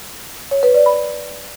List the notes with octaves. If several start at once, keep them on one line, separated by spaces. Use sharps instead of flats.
C#5
B4
D5
B5